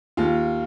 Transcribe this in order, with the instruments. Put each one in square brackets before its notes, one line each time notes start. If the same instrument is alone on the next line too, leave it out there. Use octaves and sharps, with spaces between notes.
[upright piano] D#2 F4